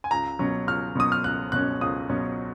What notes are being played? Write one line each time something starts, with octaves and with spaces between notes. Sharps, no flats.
G#5
C#2 A#5
B2 F#3 C#4
C#2 F6
B2 F#3 C#4 D#6
F6
C#2 F#6
B2 F#3 C#4 F#6
C#2 D#6
B2 F#3 C#4